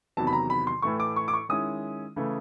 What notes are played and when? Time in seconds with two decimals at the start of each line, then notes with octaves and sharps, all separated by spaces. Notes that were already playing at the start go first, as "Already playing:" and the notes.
0.17 E2 C3 D#3 F#3 A5
0.27 B5
0.33 A#5
0.50 B5
0.67 C6
0.82 A2 E3 A3 C#6
1.00 D6
1.16 C#6
1.28 D6
1.33 C#6
1.49 D#3 G#3 C#4 E4 D#6
2.16 C#3 E3 A3